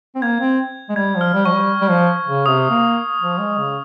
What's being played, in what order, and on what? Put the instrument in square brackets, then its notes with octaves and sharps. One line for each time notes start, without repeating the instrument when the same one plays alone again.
[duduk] C4
[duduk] A#3 [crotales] G#6
[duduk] C4
G#3
[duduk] G3 [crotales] G#6
[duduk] F3
[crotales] F6
[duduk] G3
[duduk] F3 [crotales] C#6
[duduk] G3
G3
F3
C#3
[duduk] C3 [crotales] D#6
[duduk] A#3
F3
G#3
C#3